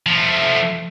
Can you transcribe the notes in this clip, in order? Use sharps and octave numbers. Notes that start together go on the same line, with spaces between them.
F3 A3